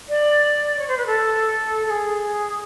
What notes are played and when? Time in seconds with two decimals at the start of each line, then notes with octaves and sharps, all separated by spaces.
0.09 D5
0.79 C#5
0.88 C5
0.98 B4
1.06 A4
1.86 A4
1.90 G#4